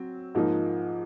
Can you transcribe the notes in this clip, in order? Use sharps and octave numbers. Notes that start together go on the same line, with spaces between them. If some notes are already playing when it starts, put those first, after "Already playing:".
Already playing: F#3 C4
G#2 F3 A#3 D#4